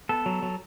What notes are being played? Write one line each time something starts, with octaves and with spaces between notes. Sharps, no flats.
B3 A4
F#3
F#3